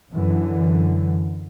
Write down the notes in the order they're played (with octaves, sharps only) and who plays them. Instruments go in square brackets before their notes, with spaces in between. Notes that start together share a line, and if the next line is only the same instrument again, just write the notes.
[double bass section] F#2 D3 E3